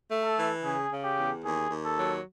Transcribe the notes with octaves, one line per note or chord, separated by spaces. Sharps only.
A3
A4
E3
C#3 G#4
C#3
G4
E2
D#2 G#4
D#2
A4
F#3